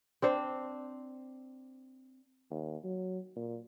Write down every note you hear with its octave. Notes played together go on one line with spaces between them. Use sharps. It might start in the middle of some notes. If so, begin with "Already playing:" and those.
C4 D4 C5
D#2
F#3
A#2